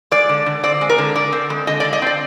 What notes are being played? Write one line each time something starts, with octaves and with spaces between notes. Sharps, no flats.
G#3 D5
D3
D3
C4 D5
G#3
A#4
D3
D3 D5
C4
G#3
D3 D#5
D5
D3
D#5
C4 D5